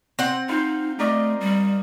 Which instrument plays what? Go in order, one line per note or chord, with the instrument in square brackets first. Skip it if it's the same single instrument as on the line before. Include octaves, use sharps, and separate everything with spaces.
[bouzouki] C4 F#5
[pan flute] D#4 [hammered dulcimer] F4 C5
[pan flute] A3 [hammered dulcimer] A#4 D5 D#5
[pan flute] G3